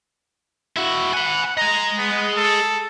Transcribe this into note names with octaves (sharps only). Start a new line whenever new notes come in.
E4 F#4
F#5 G#5 B5
G#4 D#5 A#5
B3
A4